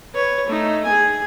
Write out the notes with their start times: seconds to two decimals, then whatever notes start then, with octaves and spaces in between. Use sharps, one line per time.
0.13 B4 C#5
0.46 A3 D#4
0.85 G#4 G#5